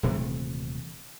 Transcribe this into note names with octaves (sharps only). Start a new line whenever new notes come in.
D#1 C3 E3 A3